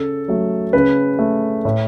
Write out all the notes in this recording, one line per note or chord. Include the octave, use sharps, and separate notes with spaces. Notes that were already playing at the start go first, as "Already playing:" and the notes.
Already playing: C#3 A4
F#3 A3
C#3 B4
A3
A2